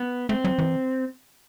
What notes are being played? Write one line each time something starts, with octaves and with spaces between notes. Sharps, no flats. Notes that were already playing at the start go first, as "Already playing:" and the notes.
Already playing: B3
A3 C4
F#3
E3